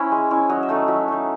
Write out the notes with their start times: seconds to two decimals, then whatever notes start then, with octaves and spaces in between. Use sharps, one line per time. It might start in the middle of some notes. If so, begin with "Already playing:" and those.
Already playing: C#4 E4 C5
0.12 G#3
0.31 C#4 E4
0.49 F#3 D#5
0.63 E5
0.69 A3 D#4
0.76 D#5
0.88 F#3 E5
1.08 A3 D#4